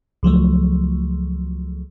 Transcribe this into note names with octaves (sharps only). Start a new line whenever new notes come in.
C#2 F3 F#3 A3